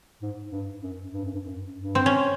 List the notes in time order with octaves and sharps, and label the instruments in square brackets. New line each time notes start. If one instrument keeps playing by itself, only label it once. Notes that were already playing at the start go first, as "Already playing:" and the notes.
[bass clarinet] G#2
G2
F#2
G2
F#2
G2
F#2
G2
[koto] C4
C#4